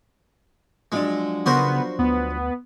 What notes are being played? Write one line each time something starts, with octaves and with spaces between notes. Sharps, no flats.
F3 F#3 G#3 D4
C#3 B3 F#4 A#4 C5
D2 B3